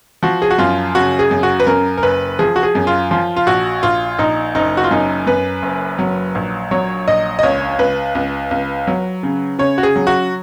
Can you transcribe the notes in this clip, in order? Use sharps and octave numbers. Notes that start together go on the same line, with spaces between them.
F3 F#4
G#4
F#4
F#2 F4
C#3 F#4
G#4
F#2
F#4
B4
F#2 A#4
A#4
F#1 B4
F3 G#4
F#4
G#4
F#2
F4
F3 F4
F4
A#1 F#4
A#1 F4
A#1 D#4
F#1 D#4
F#4
F4
F#2 D#4
F#2 B4
F#1
F#3
A#1
F#3 C#5
A#1 D#5
D#5
C#2 C#5
C#2 B4
C#2
C#2
F#3
C#3
C#3 C#5
F#4
G#4
F#3
F#4